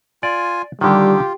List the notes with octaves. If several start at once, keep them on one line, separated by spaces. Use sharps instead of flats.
F4 D5 G#5
D3 D#3 G3 F4 G4